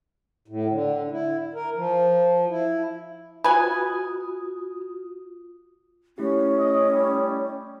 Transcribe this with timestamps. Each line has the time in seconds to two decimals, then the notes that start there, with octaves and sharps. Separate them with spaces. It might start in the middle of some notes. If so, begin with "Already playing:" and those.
0.48 A2
0.70 D3
1.11 E4
1.54 A#4
1.76 F3
2.49 E4
3.44 F4 F#4 B4 G#5 D#6
6.18 A3 C#4 E4 G4
6.58 D#5
6.93 G3